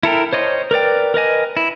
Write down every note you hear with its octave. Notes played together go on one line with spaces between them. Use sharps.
E4 A4 A#4 G5
C5 C#5 D#5 C6
A#4 B4 D5 G5
A#4 B4 D#5 G#5
E4